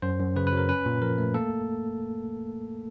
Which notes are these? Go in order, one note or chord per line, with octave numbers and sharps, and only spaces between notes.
F#2 C5
F#2
C#3 B4
B4
F#3 A#4
C#4 B4
A#2
F3 A#4
A3
A#3 A4